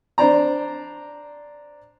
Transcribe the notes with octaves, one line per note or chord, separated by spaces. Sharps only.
D4 C5 D5 A#5